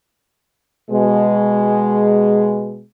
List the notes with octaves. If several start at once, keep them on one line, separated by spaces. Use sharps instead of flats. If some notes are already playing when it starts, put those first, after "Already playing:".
B2 G#3